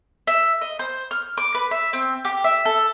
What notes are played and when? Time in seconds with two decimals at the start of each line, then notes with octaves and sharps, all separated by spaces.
0.27 E5
0.61 D#5
0.79 C5
1.11 F6
1.38 D6
1.55 B4
1.71 E5
1.93 C4
2.25 G4
2.44 E5
2.65 A4